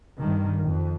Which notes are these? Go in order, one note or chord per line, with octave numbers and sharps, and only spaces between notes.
G2 D#3
F2